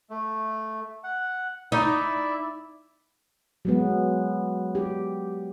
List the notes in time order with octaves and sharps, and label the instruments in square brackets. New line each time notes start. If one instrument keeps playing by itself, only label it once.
[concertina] A3
F#5
[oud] D#4 [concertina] E4 D5 E5
[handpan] F#3 G#3 B3
G4